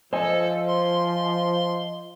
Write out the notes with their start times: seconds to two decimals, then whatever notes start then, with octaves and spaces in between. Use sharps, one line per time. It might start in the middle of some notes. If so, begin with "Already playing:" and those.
0.13 F3 A4 C5 D#5 G#5
0.67 C6